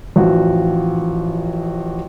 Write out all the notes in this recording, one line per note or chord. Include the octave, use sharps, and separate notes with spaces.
A1 F3 F#4 F#5